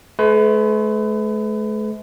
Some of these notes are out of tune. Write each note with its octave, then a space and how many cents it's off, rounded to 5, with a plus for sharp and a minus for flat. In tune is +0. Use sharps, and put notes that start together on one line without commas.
A3 -45 B4 +30